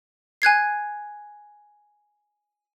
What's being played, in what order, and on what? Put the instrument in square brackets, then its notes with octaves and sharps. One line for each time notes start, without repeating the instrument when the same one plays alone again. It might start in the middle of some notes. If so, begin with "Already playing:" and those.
[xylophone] G#5 F#6 G#6 C7